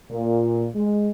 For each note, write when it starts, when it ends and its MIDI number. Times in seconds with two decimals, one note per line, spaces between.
0.10 0.67 46
0.75 1.10 56